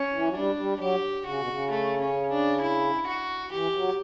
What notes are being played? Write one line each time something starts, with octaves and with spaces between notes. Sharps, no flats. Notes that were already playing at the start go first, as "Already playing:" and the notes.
Already playing: C#4
E3
F#3
G3 D4
G3
F#3 G4
C#3 F#4
B2
C#3
A3
C#4
D4
E4
F#4
E3 G4
F#3